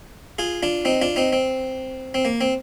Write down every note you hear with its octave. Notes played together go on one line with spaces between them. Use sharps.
F4 G#4
D4 F4
C4 D#4
D4 F4
C4 D#4
C4
C4
A#3
C4